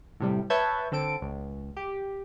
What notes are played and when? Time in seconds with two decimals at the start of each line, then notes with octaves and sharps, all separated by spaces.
0.20 A2 C3 G3
0.50 B4 C#5 E5 A5 G6 G#6
0.92 D3 C4 A4 D7
1.22 C#2
1.77 G4